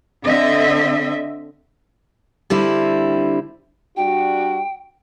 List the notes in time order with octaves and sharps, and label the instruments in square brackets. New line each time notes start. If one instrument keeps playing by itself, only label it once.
[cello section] D3 C4 D#5 E5
[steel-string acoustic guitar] D3 G3 C4 E4
[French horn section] G3 D4 F#4 [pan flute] G5